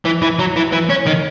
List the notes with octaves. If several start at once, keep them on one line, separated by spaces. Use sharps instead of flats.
E3
E3
F#3
E3
E3
C#4
D#3